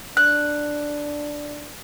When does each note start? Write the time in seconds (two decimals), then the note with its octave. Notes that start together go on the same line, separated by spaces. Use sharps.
0.17 D4 F#6